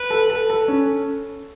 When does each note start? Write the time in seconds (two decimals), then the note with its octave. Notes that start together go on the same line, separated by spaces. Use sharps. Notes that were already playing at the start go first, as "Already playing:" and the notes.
Already playing: B4
0.10 A4
0.30 A4
0.50 A4
0.68 C#4